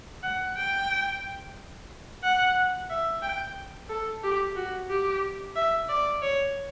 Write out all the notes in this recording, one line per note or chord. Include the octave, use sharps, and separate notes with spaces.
F#5
G5
F#5
E5
G5
A4
G4
F#4
G4
E5
D5
C#5